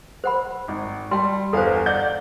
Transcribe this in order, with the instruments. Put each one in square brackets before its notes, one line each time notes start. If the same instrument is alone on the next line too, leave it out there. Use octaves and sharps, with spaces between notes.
[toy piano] C5 F#5 B5
[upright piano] G#1
[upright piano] G3 [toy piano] G5 A5 C6
[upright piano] G1 E2 F5 [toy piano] A4 C5
[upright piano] D5 F#5 G6